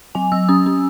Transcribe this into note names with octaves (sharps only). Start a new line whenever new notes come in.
F#3 G#5
F#3 E6
C#4 D#6
C#4